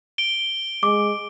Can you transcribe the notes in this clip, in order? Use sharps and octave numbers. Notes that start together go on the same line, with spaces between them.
D7 G7
G#3 D6